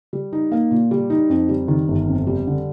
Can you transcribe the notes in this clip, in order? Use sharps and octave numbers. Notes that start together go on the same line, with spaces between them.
G3
D#4
A#3
A#2
G3
D#4
F2
G3
D#3
G1
F2
G3
D3